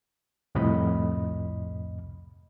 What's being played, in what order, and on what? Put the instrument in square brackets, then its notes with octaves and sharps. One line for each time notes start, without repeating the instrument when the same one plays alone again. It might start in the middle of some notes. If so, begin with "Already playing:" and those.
[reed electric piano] C2 F2 A2 C3 D#5 B5